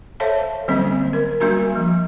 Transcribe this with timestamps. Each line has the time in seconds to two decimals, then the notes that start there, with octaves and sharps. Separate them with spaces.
0.20 A4 C5 C#5 E5 F5 A5
0.68 D3 F#3 G3 A#3 C4 C#4
1.13 A#4
1.40 G3 A#3 D4 F#4 A#4 A#5
1.76 F3